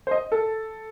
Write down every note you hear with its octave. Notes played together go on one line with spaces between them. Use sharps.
C5
D#5
A4